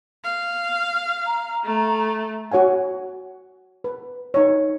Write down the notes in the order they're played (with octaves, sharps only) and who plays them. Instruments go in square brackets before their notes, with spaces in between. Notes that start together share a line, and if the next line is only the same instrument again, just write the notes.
[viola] F5
[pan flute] A#5
[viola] A3
[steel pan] F#4 C#5 F#5 G#5
B4
D#4 C#5